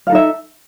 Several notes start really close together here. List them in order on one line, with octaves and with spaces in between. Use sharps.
F5 A4 D#4 E5